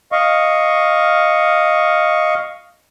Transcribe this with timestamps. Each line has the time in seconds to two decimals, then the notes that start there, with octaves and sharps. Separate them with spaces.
0.12 D#5 F5 C#6